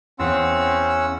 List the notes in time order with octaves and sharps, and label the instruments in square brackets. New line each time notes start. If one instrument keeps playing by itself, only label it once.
[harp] E2 F5 [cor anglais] C4 [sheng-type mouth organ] C#4 F#5 E6